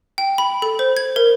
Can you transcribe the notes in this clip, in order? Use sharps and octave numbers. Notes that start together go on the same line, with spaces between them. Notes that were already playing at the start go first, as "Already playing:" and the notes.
G5
B5
A4
C5
G#6
A#4